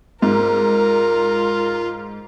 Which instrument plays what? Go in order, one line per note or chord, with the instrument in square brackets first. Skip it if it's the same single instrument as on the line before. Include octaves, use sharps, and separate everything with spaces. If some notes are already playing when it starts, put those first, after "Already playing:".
[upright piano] G#2 [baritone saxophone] F4 [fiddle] A#4